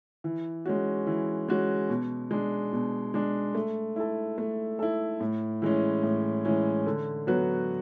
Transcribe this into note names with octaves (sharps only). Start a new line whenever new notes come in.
E3
G#3 C#4 F#4
E3
G#3 C#4 F#4
B2
G#3 D4
B2
G#3 D4
A3
E4 A4
A3
E4 A4
A2
E3 G#3 C#4
A2
E3 G#3 C#4
D3
F#3 B3 F#4 B4